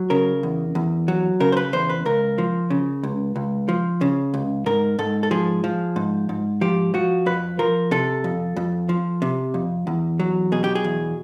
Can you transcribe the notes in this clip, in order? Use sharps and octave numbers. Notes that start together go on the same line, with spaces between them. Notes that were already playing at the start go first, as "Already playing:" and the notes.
Already playing: F#3
C#3 A#4
E2
E2
F#3
C#3 A#4
C5
B4
E2 C5
B4
C#2 A#4
F3
C#3
C#2
C#2
F3
C#3
C#2
G#2 A#4
G#2 A4
A4
F3 G#4
F3
G#2
G#2
F3 G4
F3 F#4
F2 B4
F3 A#4
C3 A4
F2
F2
F3
C3
F2
E2
F#3
B2 G#4
G4
G#4
E2